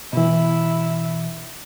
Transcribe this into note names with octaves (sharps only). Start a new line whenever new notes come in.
B2 E3 E4